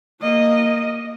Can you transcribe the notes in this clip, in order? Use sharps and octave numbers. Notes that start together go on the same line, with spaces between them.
A#3 D#5